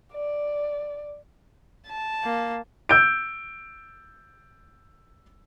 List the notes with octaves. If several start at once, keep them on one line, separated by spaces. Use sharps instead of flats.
D5
A5
A#3
E6 G6 D7